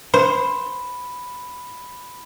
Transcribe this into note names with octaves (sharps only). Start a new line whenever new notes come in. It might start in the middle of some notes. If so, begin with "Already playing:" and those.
C5 B5